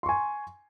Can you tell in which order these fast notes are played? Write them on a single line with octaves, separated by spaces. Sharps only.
C6 C#6 G#5